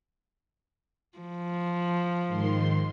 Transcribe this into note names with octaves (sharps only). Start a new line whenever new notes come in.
F3
G#2 D#3 C6